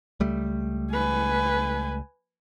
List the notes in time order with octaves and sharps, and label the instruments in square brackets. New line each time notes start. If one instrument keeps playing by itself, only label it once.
[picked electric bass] C#2 G3 A3
[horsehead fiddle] B4 G#5